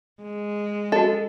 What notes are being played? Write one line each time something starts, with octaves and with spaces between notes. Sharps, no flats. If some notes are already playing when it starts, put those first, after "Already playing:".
G#3
F#4 A4 D#5